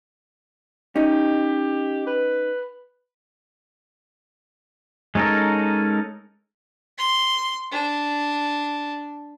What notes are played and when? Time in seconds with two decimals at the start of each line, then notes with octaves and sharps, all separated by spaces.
0.96 C#4 D#4 G4
2.07 B4
5.15 G#3 C#4 D#4 A4 A#4
6.98 C6
7.72 D4